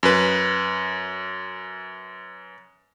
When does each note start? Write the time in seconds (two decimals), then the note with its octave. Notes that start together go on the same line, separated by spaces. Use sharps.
0.03 F#2 B4